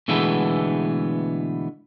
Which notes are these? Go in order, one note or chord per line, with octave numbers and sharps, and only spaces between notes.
B2 D3 E3 G#3 A3 B3